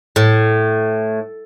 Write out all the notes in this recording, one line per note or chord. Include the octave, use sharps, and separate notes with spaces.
A2